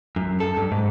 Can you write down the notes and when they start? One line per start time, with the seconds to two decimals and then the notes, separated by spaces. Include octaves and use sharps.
0.16 F#2
0.40 A4
0.57 G2
0.72 G#2